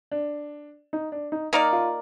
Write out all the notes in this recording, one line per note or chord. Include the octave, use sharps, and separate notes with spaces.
D4
D#4
D4
D#4
A#3 D#4 A#4 D5
F4